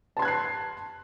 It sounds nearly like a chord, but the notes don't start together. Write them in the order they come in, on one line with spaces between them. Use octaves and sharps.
A5 C6 G#6 F#6 C7